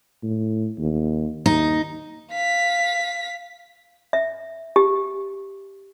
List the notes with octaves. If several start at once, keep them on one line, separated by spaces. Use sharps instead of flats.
A2
D#2
D#2 D#4
F5 B6
E5
G4